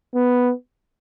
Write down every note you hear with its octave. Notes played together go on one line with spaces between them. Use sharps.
B3